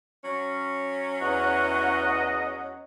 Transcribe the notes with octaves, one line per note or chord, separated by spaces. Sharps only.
F#3 C#4
E2 D#5 F#5